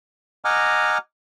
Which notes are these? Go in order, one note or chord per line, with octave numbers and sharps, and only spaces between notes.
D#5 F#5 G#5 A#5 D6 F6